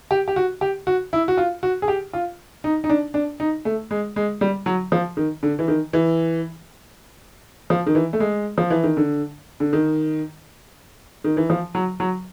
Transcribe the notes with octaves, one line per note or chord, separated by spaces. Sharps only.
G4
G4
F#4
G4
F#4
E4
F#4
F4
F#4
G#4
G4
F4
D#4
D#4
D4
D4
D#4
A3
G#3
G#3
G3
F#3
F3
D#3
D3
E3
D#3
E3
F3
D#3
E3
A3
G#3
F3
E3
D#3
D3
D3
D#3
D#3
E3
F3
F#3
F#3